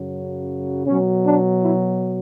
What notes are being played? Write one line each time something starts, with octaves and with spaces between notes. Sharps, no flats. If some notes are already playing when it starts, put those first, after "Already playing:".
Already playing: F#2 C#3 F#3
B2 F#3 C#4
D4
E4